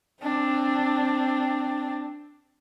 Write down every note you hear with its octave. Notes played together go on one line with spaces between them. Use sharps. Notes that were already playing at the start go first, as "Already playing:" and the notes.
C4 D4